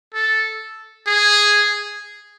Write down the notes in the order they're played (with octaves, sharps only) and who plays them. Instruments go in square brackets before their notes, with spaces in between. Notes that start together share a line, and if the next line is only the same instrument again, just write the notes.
[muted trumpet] A4
G#4